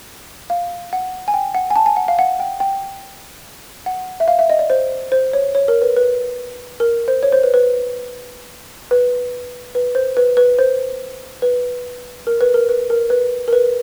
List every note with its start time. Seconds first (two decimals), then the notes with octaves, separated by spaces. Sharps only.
0.50 F5
0.93 F#5
1.28 G#5
1.34 G5
1.55 F#5
1.70 G#5
1.76 A5
1.86 G#5
1.97 F#5
2.08 F5
2.19 F#5
2.40 G5
2.60 G5
3.86 F#5
4.20 E5
4.28 F5
4.39 E5
4.50 D#5
4.59 D5
4.70 C5
5.12 C5
5.33 C#5
5.55 C#5
5.68 A#4
5.82 B4
5.97 B4
6.80 A#4
7.08 C5
7.23 C#5
7.32 C5
7.43 B4
7.54 B4
8.91 B4
9.75 B4
9.95 C5
10.17 B4
10.37 B4
10.58 C5
11.42 B4
12.27 A#4
12.41 B4
12.54 A#4
12.69 B4
12.90 A#4
13.10 B4
13.48 A#4
13.53 B4